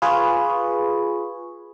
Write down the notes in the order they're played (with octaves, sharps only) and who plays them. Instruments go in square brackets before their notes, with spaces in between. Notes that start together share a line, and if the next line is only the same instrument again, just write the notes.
[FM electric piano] F4 G#4 B4 [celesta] B5 C#6